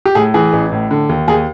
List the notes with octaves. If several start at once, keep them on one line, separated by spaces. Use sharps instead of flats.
G4
A2 G#4
E3 G#4
A1
A2
D3
D#2
D#2 G#4